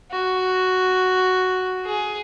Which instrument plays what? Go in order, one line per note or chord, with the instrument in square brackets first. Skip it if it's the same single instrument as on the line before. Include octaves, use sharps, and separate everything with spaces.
[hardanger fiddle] F#4
G#4